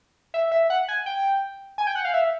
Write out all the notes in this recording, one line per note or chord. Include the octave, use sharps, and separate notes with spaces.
E5
E5
F#5
G#5
G5
G#5
G5
F#5
F5
E5